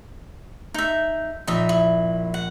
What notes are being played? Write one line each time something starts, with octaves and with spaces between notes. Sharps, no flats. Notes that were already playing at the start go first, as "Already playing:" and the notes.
D#4 E5 G6
A#1 D#4 D#5 E5
E4
F#5